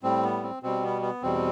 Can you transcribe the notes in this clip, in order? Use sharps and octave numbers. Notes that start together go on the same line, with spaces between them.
A2 G3 C4
B3
C4
B2 G3 C4
B3
B3
E2 B2 G3 C4